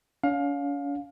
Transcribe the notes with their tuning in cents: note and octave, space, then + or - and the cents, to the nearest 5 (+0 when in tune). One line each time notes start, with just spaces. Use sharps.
C#4 +40 F5 +25